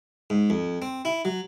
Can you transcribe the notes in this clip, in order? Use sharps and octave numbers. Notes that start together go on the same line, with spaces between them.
G#2
F2
C4
E4
F#3